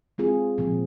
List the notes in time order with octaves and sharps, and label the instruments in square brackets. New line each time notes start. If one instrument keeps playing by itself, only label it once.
[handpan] G#3 C4 F4 G#4
A#2 F3 C4